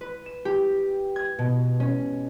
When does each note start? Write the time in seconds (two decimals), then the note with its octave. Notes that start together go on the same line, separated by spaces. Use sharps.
0.01 B4
0.26 E7
0.45 G4
1.16 G#6
1.39 B2
1.80 C#4